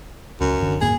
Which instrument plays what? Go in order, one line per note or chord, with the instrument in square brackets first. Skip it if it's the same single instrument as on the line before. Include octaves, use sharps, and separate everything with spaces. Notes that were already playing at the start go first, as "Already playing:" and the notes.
[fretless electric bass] C#2 [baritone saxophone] F#2
[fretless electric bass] F#1 D3
[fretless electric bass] D#1 G#2 A#3 [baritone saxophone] G#4